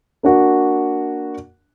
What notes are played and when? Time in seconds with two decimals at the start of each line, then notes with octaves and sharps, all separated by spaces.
0.23 A#3 D4 F#4